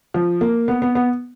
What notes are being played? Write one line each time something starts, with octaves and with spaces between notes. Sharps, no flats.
F3
A#3
B3
B3
B3